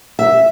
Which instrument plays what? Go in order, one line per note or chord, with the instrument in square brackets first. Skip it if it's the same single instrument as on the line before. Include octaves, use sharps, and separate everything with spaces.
[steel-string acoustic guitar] E5